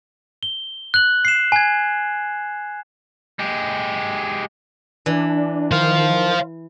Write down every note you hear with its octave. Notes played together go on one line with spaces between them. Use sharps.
G7
F#6 F#7
C7 E7
G#5 G#6
G#3 G4
E3 D4
D#3 C5 F5